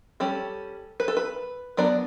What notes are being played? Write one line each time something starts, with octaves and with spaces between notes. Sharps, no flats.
G3 C#4 A4
B4
A4
B4
F#3 B3 D4 D5